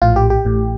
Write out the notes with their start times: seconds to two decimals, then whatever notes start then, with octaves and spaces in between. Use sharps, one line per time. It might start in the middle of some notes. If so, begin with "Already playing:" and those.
0.02 A#1 A2 F4
0.16 G4
0.30 G4
0.45 A1 A2